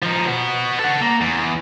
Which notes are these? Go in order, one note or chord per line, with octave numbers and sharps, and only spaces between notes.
F3 D#4
B3 F#4
A4 F#5
A#3
E2